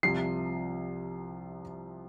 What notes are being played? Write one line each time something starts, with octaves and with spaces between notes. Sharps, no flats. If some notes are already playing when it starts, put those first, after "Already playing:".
C2 C3 F3 C7